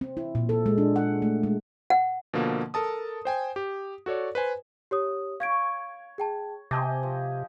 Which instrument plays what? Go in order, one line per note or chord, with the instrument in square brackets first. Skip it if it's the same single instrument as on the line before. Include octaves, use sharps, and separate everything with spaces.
[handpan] C4
E4
A#2
A4
G#3
D4
F#5
A3
G#3
[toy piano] F#5
[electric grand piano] B2 D3 F3 A#3
A4 A#4 A5 D#6
C5 G5 G#5
G4
F#4 A4 C#5 D5
B4 C5 G#5
[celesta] G4 C#5 D#6
[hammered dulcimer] C#5 C#6 [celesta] F5 G#6 D7
[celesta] G#4 G5 A5
[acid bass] C3 [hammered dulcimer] G4 D#5 G#5 [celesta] A5 D6
[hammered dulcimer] F3